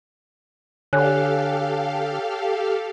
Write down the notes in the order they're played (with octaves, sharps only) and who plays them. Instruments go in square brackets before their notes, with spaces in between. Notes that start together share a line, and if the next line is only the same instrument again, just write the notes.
[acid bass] D3 [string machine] G4 A4 F5 [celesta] C#5 G#5 F#6